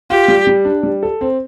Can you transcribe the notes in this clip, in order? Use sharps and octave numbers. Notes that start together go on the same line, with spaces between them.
F4 G4
G3
G3
D4
G3
A4
C4